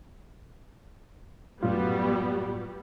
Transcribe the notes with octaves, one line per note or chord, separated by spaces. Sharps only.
F#2 A2 G3 B3 F4 F#4